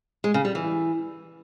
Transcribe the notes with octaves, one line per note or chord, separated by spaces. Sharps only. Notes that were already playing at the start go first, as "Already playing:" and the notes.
G#3
C#3
G3
E3